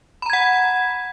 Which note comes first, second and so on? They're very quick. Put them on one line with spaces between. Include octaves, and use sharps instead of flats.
B5 A#5 G#6 F#5